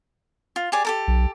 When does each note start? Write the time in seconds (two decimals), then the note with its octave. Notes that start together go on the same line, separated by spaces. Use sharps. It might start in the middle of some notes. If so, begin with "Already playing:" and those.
0.56 F4
0.72 G4 G#4 D5
0.85 G4 A4 A#4
1.08 B1